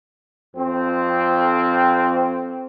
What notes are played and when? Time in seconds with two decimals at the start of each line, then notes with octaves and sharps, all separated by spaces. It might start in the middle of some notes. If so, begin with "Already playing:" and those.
0.56 F2 C4